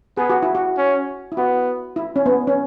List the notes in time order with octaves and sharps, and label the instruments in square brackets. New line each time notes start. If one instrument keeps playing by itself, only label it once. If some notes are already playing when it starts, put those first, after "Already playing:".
[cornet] B3 [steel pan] G#4
[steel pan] F#4
E4
F#4
[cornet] C#4
[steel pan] E4
[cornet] B3 [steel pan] F#4
[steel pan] E4
C#4
B3
C#4